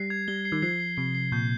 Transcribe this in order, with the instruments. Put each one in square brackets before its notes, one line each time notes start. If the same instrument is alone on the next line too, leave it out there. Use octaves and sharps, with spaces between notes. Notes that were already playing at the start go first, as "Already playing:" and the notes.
Already playing: [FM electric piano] G3 [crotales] C7
[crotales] G#6
[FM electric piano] G3 [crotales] G7
[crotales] C7
[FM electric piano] D#3
[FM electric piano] F3 [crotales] C7
[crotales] C7
[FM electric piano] C3 [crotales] C7
[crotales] C7
[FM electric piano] A#2 [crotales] G6